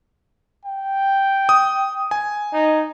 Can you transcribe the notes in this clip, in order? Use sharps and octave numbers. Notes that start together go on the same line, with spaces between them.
G5
D#6
G#5
D#4